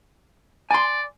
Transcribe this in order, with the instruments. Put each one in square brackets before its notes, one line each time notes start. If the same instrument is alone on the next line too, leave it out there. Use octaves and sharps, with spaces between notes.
[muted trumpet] D5 [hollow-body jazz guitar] G#5 C6